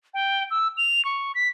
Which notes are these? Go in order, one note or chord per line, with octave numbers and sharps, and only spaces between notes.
G5
E6
F7
C#6
B6